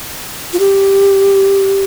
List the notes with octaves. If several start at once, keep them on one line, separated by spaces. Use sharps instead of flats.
F4
G4